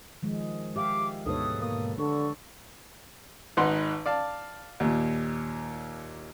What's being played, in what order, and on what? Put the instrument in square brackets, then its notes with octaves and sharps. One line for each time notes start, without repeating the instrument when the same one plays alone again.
[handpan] D#3 F3 G#3
[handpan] G4 E5 F5 [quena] D6
[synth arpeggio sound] D2 G#2 B2 [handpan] A4 B4 C#5 [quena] D#6
[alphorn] A#3 [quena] D#6
[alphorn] D3 [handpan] D4 A4 [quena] C#6
[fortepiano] G#1 D#4 B4 F#5 C6
D5 F5 A5
D#2 A#2